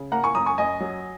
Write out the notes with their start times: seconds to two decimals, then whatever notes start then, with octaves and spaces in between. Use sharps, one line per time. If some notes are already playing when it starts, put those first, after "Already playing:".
Already playing: C#3
0.12 A#3 F#5 A#5
0.24 G#5 C#6
0.35 F#2 A#5 D#6
0.46 G#5 C#6
0.58 F#2 D#5 G#5
0.80 F#3